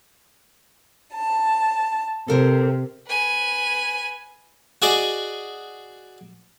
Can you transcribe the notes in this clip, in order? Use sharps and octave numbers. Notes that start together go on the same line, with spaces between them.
A5
C3 A4 A#4 C5
B4 G#5
F#4 G#4 D5 D#5